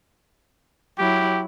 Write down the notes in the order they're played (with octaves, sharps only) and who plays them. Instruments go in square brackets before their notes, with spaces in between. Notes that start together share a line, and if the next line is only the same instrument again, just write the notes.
[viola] F#3 E4 [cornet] G4